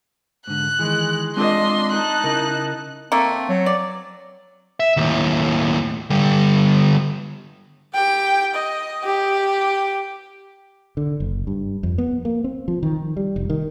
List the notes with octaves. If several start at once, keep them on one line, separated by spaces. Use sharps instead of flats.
G#2 D3 F#6
D#3 E3 G#3
G#3 C4 D4 F4 D#5 C6
D#4 A5 F#6
C#3 E4 A#4
A3 A#3 C4
F#3
D5
E5
D#2 A2
D3 G3
G4 G5
D#5
G4
D3
F#1
G2
F2
B3
A#3
C4
F3
D#3
G3
F1
D#3